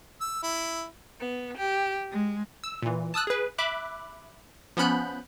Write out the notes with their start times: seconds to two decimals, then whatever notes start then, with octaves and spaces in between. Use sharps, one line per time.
0.21 E6
0.43 E4
1.21 B3
1.58 G4
2.11 G#3
2.64 E6
2.82 A#2 E3
3.14 A5 D#6 E6 F#6
3.27 G#4 B4
3.58 E5 B5 D6 F#6
4.77 F3 B3 C#4 B5 F#6 G6